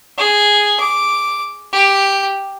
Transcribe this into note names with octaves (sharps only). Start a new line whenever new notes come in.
G#4
D6
G4